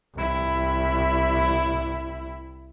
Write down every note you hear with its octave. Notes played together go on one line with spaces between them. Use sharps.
C2 E4